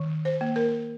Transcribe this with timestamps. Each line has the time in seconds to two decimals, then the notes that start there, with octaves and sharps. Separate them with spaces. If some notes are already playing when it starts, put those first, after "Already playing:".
Already playing: D#3
0.25 C5
0.41 A#3
0.56 A#4